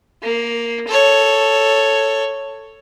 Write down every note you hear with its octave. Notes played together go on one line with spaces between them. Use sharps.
A#3
A4 C#5